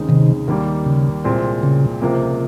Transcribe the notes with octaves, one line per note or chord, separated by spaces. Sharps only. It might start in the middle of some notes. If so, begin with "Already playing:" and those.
Already playing: D#2 C#3 G#3 C4 D#4
C3 D#3
D#2 D#3 G3 A#3
C#3
C2 A#2 G#3 C4
C#3
C#2 C3 F3 A#3